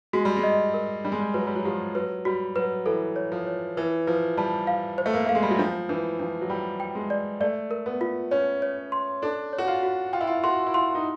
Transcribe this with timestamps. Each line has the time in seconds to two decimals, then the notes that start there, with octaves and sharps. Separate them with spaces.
0.13 G#3 F#4
0.25 G3
0.37 G#3
0.43 D#5
0.74 A#4
1.04 G3 D4
1.12 G#3
1.20 G3
1.34 F#3 B4
1.47 G3
1.56 F#3
1.65 F3 G4
1.95 F#3 B4
2.25 G3 F#4
2.56 F#3 B4
2.86 E3 A4
3.16 C#5
3.32 F3
3.47 C#5
3.77 E3 B4
4.07 F3 B4
4.37 G3 A5
4.67 F5
4.98 C5
5.06 A3
5.13 A#3
5.26 A3 F5
5.35 G#3
5.43 G3
5.51 F#3
5.59 F3 D4
5.89 E3 D4
6.19 F3 D4
6.41 F#3
6.50 G3 G5
6.80 G5
6.95 G#3
7.10 D5
7.40 A3 D5
7.71 A#4
7.86 B3
8.01 F4
8.31 C#4 C#5
8.62 C#5
8.92 C6
9.22 D4 A4
9.53 C#5
9.58 F#4
9.67 F4
9.83 F#4
10.13 F4 G5
10.21 E4
10.27 F4
10.44 F#4 C6
10.67 E4
10.74 F4 C6
10.95 D#4